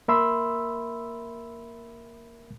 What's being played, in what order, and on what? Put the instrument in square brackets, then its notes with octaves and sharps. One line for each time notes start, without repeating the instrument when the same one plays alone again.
[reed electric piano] A#3 A#4 E5 B5 C6 E6